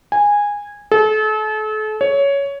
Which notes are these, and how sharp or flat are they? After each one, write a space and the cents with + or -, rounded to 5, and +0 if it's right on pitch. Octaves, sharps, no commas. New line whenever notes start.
G#5 -15
A4 -40
C#5 +10